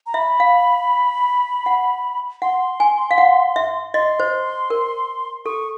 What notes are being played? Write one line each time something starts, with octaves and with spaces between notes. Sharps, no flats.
A#5
E5 B5
F5
F#5
F#5 C6
G#5
F5
F#5
E5
D#5 C6
C5
A#4
A4 C#6